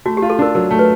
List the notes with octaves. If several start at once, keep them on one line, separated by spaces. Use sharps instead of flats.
A3 F#4
G4
F4
A4
D4 A#4
F#3 A#4
A3
B4